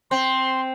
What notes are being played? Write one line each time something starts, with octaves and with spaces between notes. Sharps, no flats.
C4 C6